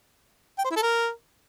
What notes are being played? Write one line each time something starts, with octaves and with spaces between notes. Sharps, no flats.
G5
C5
E4
A4
A#4